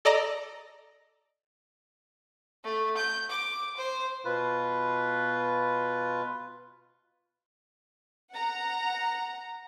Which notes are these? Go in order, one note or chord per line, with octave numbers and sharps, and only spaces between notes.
A4 D5 D#5 A#5
A3
G6
D6
C5
B2 F4 B4
F#5 A#5